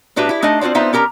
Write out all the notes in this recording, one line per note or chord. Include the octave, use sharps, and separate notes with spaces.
A2 D4 F#4 G4 B4 E5
E4 G4
A3 D4 D#4 D#5
C4 F4 F#4 C5 D5
B3 C4 D#4 F4 C5 E5
C#4 G4 A#4 A#5